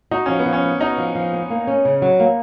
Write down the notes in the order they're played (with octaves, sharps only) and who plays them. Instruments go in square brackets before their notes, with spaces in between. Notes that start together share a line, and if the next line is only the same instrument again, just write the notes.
[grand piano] D#4 [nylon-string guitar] F#4
[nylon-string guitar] F3 [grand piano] C#4
[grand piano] B3
[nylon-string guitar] F3
[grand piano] C#4
[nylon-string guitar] B3
[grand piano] D#4 [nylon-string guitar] F#4
[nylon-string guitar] F3
F3
B3
A#3
C#4
C#3
F#3
A#3